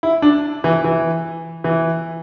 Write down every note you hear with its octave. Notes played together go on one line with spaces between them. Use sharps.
E4
D4
E3
E3
E3